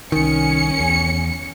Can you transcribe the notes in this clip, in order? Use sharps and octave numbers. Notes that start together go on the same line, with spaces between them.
C2 D#3 C#4 C#7
E2